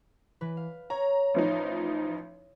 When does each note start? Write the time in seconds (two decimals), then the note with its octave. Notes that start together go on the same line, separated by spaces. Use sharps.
0.41 E3 B4
0.57 F5
0.90 C#5 A#5
1.34 A1 F3 D#4